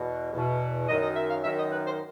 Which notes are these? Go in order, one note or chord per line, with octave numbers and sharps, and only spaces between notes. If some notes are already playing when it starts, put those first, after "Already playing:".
Already playing: E2 B2
E2 B2
F#2 D#3 D#5
D#5
E5
F5
F#2 D#3 E5
D#5
B4
C5